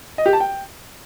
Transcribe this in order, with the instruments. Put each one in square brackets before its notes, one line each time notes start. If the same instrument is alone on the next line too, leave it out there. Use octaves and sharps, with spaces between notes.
[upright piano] D#5
G4
A5
G5